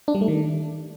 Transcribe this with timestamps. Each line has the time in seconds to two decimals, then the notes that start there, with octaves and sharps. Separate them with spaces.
0.08 D4
0.15 G3
0.21 A3
0.28 D#3